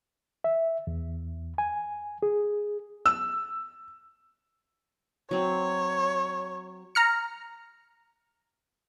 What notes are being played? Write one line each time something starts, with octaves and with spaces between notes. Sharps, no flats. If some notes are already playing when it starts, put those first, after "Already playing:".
E5
E2
G#5
G#4
E6
F#3 C4 C#5
A#5 F6 C#7